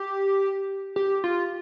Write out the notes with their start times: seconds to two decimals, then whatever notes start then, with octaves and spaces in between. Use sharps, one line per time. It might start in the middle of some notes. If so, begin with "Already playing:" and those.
Already playing: G4
0.96 G4
1.24 F4